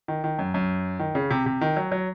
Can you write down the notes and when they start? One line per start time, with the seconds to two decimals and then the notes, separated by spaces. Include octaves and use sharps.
0.08 D#3
0.24 D#3
0.39 F#2
0.54 F#2
0.99 D#3
1.15 C#3
1.31 C3
1.46 C3
1.61 D#3
1.76 F#3
1.92 F#3